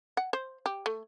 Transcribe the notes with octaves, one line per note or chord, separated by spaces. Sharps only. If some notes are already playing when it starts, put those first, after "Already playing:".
F#5
C5
G4
A3